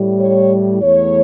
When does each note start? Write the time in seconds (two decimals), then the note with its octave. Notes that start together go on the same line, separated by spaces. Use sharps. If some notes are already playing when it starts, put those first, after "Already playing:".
Already playing: A2 G3
0.21 C#5
0.82 E2 E3 A3 C#5